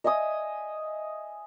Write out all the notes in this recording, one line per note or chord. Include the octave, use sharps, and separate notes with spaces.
D#5 E5 G#5 D#6